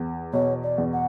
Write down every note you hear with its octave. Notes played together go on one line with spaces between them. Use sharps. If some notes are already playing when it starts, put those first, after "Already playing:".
Already playing: E2
B2 C#5
D5
E2
F#5